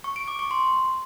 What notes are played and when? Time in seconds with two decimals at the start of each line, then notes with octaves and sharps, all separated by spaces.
0.04 C#6
0.16 D7
0.28 D6
0.39 C#6
0.51 C6